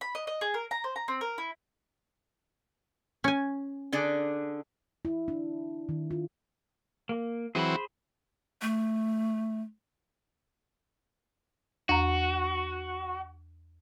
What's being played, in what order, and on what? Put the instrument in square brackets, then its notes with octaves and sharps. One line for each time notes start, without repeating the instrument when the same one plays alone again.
[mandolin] B5
D#5
D#5
G#4
A#4
A#5
C5
A#5
C4
A#4
E4
[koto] C#4 G#5
[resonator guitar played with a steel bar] D3 D4 G#4
[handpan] E4
D4
D#3
F4
[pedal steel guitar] A#3
[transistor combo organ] E3 F#3 C4 [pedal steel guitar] G#4 C5 B5
[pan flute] A3
[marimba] E2 A#5 [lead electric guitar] F#4